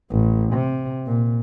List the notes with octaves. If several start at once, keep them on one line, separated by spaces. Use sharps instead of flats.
A1
C3
A#2